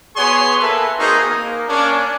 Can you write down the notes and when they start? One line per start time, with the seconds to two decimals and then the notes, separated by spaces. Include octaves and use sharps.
0.16 B3 F#4 G#4 C#5 G#5 C6
0.60 A#3 A4 B4 E5
0.98 A#3 C4 D#4 F#4 G#4 A#4
1.26 A#3
1.68 A#3 C#4 D4